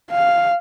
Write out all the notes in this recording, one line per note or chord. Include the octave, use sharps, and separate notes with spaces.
F5